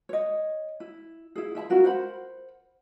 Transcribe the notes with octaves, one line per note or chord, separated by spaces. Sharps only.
C#5 D#5
E4
E4 G#4
E4 E5 A5 B5
C#4 F4 F#4 A#4
A#4 C5 F#5 B5